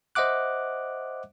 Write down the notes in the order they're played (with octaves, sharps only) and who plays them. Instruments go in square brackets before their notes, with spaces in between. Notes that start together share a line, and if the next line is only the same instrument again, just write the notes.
[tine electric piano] C5 D#5 E5 F#5 D6 F#6